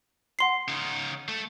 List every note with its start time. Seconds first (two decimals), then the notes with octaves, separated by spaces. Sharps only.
0.39 F#5 C6 C7
0.68 C#3 D#4
1.28 A3 A4